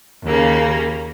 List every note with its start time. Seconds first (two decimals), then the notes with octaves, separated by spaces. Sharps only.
0.25 D#2 C#3 A#3